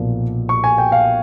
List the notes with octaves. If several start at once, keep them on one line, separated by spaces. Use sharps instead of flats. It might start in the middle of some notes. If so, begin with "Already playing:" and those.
Already playing: B1 A#2 F3 A#3
C#6
G#5
G5
F5